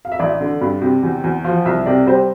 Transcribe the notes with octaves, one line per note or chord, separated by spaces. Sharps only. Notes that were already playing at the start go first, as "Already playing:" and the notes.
F5
E5
A1 D5
D3
G2
C3
E2
E2
F3 F5
C2 E5
C3 D5
G3 C5